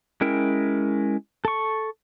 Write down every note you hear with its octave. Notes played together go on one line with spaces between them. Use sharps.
G#3 C#4 E4 A#4 G5
A4 C#6